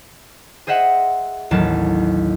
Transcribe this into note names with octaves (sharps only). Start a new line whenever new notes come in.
G#4 C5 D#5 E5 F#5
A1 D#2 F#3 A5